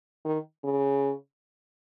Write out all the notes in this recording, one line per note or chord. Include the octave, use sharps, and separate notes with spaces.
D#3
C#3